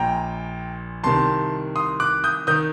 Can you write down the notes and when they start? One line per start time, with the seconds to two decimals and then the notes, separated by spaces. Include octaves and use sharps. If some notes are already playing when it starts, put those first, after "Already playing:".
Already playing: A#1 A#2 G5 A#5
1.04 C2 C3 D#3 A5 C6
1.75 C6 D#6
2.00 D6 F#6
2.24 D#6 G6
2.47 D#3 D#6 G6